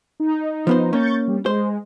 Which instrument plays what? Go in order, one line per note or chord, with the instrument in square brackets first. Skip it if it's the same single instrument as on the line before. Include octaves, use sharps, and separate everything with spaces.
[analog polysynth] D#4
[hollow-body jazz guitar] F3 B3 C5
[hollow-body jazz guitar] A#3 C#4 [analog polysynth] C#6 G6 A6
[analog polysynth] G3
[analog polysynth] G#3 [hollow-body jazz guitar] C5